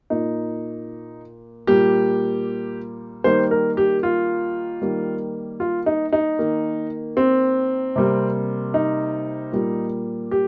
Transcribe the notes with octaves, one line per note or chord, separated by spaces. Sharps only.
A#2 A#3 D#4
A#2 G3 A#3 G4
D#3 G3 A#3 C5
A#4
G4
F4
D#3 G3 A#3
F4
D#4
D#4
D#3 A#3
C4
C3 G3 A#3
D#4
A#2 G3 A#3
G4